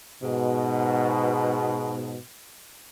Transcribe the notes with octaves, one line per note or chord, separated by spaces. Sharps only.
G#2 B2